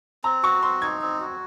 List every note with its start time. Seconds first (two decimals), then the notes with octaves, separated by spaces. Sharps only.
0.24 C4 A#5
0.43 F#4 C#6
0.63 C4 C6
0.82 D#4 G#6
1.02 C4
1.20 F#4